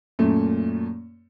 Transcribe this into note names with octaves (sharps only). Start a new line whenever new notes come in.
F#2 A#2 A3